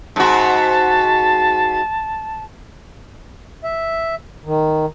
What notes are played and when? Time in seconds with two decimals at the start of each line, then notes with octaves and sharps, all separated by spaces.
0.16 G#2 F#4 A5
3.64 E5
4.46 D#3